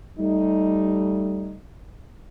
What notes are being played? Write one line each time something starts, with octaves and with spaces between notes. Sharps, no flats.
G3 A3 D#4